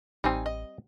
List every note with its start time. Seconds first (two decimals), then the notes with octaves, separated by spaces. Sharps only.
0.24 A1 G3 C4 D#4 G#5
0.46 D#5